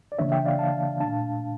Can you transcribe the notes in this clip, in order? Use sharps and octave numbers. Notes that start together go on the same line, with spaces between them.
D5
C#3 E3 A#3 D4 C#5 E5
E5 G5
D5 F5
F5 A5
A#2 A3 D4 F5 A5